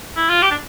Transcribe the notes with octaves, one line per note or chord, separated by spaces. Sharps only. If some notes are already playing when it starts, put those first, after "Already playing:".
E4
F4
G4
D4